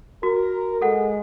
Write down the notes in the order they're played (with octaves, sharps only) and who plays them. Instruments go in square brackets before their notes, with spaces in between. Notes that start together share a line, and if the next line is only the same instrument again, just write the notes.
[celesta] F#4 [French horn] A#4
[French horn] G#3 [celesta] A4 F#5